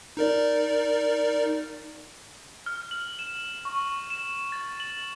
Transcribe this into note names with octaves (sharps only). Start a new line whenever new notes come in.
D#4 A#4 D5
F6
F#7
E7
C#6
E7
A6
F#7